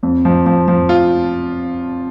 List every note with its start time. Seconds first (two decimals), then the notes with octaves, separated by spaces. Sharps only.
0.03 F2
0.25 F3
0.46 F3
0.68 F3
0.89 F4